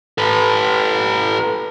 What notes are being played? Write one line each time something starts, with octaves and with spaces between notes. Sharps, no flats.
A4 B4